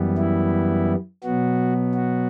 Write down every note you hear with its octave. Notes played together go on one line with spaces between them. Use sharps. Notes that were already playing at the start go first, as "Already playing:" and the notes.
Already playing: F#2 E3 G3 B3
E4
B2 F#3 B3 F#4
F#4